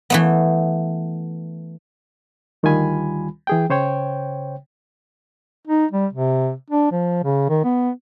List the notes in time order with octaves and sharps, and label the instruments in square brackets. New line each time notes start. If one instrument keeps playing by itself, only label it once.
[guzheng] E3 A3 B3
[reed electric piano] D2 D#3 G3 F4 G#5 B5
E3 G#4 G5
C#3 C5 C#5 G5
[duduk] D#4
G3
C3
D4
F3
C#3
D#3
B3